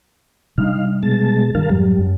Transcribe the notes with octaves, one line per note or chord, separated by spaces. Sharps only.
C3 G3 D4 D#4 F5
B2 G#3 A5
G2 D#3 A#4 F5 A5
F2 G#2 F#3 G3
F#2